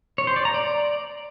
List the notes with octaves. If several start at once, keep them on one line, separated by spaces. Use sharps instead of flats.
C#5
C5
D5
A#5
D5